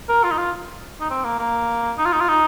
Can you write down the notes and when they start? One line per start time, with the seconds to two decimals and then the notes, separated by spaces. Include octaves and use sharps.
0.09 A#4
0.24 F4
0.31 D#4
0.38 F4
1.01 D#4
1.10 C4
1.25 A#3
1.39 A#3
1.98 D#4
2.05 F4
2.13 D#4
2.20 F4
2.29 D#4